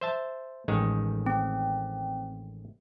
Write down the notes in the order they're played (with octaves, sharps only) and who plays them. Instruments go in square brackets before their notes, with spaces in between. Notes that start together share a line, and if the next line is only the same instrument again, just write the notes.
[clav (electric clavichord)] C5 E5 A5
A1 D#3 G#3
[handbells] C4